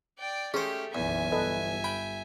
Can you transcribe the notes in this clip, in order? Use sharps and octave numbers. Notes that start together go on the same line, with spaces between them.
D5 G5
A3 C#4 G4 G#4 C5 C#6
F#1 B1 E2 E5 G#5
G1 A4 B4 D#5
G5 B5